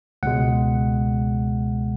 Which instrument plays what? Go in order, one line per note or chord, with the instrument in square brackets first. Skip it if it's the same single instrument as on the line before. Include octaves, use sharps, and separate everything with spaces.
[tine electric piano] C#2 B2 G#3 F#5